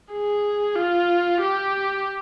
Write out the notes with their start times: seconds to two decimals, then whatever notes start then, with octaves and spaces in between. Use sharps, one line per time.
0.13 G#4
0.76 F4
1.40 G4